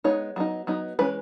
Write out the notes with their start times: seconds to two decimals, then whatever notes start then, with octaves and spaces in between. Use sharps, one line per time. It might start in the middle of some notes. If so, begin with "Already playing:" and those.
0.04 G#3 B3 D#4 C#5
0.36 F#3 B3 D#4
0.67 F#3 B3 D#4
0.99 E3 G#3 C#4 B4